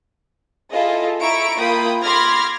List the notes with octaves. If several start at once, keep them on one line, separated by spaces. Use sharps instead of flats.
E4 F4 G#4 A4 D#5
E4 E5 A#5 C#6 D7
A#3 F4 G5 B5 D#6
B5 C6 D6 F6 G#6 A#6